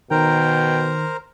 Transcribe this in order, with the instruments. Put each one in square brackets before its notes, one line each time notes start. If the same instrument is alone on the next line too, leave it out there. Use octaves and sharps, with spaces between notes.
[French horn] B2 [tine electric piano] D#3 [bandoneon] A#4 C5 A#5 [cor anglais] G5